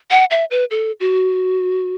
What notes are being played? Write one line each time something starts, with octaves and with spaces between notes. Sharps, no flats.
F#5
E5
B4
A4
F#4